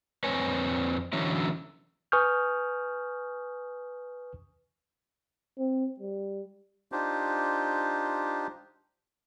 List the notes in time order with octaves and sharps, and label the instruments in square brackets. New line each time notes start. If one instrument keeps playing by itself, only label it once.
[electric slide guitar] F2 C4 B4 C#5 G#5
D3 E3 F#3 C#4 E4
[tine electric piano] B4 G#5 C#6 D#6 F6 G6
[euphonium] C4
G3
[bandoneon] D4 D#4 F4 G4 C5